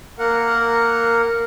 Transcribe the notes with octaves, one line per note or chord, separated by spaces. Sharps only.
A#3 A#4 F#5